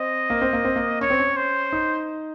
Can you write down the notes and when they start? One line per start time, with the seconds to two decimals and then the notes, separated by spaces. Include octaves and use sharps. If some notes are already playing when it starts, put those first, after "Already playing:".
Already playing: C4 D#5
0.30 A#3
0.42 C4
0.53 A#3
0.65 C4
0.76 A#3
1.01 C#4 C#5
1.10 C4
1.19 C#4
1.37 C5
1.72 D#4